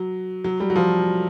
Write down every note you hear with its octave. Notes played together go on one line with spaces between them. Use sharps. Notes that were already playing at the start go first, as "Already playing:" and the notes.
Already playing: F#3
F#3
G3
F#3
F3